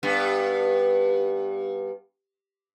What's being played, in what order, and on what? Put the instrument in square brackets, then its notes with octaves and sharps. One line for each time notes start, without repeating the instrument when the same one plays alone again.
[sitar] G2 B3